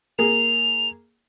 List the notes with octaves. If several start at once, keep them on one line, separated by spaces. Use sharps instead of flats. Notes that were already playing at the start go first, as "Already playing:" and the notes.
A#3 G#4 F7